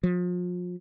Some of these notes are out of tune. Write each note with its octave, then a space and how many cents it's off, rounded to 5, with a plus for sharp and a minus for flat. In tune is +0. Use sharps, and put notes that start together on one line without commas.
F3 +35